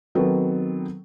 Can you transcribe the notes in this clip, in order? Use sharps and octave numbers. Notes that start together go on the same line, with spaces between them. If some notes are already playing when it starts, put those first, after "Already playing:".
D#3 F#3 B3 C4 A4 A#4